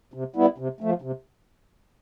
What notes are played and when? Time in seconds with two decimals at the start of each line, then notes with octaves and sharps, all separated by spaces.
0.14 C3
0.36 G3 B3 E4
0.58 C3
0.80 F3 A3
1.02 C3